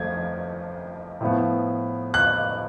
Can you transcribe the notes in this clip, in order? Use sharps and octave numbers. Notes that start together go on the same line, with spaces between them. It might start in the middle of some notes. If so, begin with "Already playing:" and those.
Already playing: F2 F3 A3 G#6
A2 F3 B3
F#6